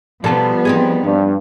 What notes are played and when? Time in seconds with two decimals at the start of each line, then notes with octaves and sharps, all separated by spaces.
0.24 B2 F3 G3 B3 F4 A4 A5
0.65 C4 D#4 G#4
1.05 G2